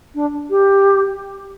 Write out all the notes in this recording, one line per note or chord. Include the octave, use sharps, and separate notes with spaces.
D4
G4